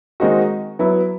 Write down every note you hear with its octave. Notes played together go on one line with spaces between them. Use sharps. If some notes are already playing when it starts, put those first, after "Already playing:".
D#3 G#3 C4 D#4 F#4
F#3 B3 E4